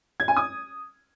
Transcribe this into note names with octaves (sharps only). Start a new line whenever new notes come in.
G#6
G#5
D#6